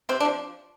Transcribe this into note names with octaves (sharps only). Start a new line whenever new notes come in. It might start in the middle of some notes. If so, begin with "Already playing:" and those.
C3 C4
D4
F3